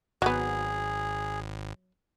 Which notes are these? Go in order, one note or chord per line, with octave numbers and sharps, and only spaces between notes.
G#1 F#3 B3 G#4